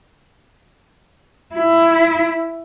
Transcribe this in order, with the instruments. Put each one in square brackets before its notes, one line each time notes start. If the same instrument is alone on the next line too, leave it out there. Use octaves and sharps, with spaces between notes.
[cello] E4